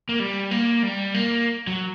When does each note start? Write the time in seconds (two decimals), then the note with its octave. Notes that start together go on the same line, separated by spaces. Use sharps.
0.09 A#3
0.20 G3
0.51 A#3
0.83 G3
1.14 A#3
1.67 F#3